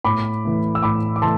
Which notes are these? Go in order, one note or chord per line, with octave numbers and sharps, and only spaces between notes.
A2 B5 D6
E3 A3
E6
A2 B5 D6
D6
E3 A3 A5 C6